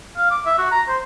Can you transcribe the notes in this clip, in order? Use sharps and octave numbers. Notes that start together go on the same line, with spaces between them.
F5
D6
E5
F#4
A#5
C5